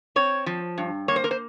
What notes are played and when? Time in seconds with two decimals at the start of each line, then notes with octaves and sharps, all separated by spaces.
0.16 C4 C#5
0.46 F3
0.78 G2
1.08 A#3 C#5
1.16 C5
1.24 A#4
1.31 C5